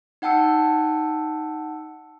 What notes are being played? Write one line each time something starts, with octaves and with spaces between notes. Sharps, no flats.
D#4 F#5 G5 A5 E6 C#7